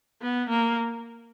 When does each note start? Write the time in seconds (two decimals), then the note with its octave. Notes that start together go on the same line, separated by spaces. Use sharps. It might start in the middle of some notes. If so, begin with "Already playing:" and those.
0.22 B3
0.50 A#3